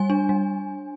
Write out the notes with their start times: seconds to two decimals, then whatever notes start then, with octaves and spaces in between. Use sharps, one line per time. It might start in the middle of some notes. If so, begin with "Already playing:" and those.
Already playing: G3 G#5
0.10 D4
0.29 G3